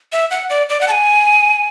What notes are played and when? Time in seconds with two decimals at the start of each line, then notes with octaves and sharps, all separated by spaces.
0.12 E5
0.31 F#5
0.50 D5
0.69 D5
0.81 F#5
0.88 A5
0.91 G#5